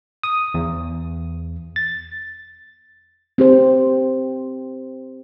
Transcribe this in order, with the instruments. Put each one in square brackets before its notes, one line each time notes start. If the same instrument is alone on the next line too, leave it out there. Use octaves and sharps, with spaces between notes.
[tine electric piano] D#6
E2
A6
[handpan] C4 G4 C5